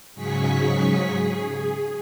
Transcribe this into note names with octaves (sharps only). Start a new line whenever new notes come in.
G#2 C#3 F#3 G#4 C#6 B6
G#4